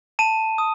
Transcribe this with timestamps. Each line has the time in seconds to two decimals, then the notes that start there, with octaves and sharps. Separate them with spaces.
0.19 A5 D#7
0.58 D#6